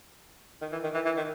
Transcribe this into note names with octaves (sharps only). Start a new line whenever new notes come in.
D#3
E3
D#3
E3
E3
D#3